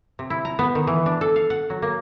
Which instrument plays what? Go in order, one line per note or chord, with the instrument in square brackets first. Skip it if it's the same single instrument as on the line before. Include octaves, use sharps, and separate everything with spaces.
[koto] C3
E4
A#5
B3
D#3
E3
D4
A4
F5
F#5
F#3
A#3